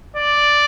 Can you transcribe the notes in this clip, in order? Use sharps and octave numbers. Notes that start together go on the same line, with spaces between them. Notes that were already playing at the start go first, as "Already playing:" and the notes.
D5